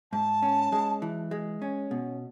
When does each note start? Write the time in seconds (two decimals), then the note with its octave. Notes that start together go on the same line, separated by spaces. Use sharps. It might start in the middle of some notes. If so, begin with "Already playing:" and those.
0.12 G#2 A5
0.42 C#4
0.72 G#3
1.02 E3
1.31 G#3
1.62 C#4
1.91 B2